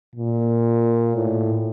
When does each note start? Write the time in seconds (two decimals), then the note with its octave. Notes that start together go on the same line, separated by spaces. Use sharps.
0.16 A#2
1.15 A2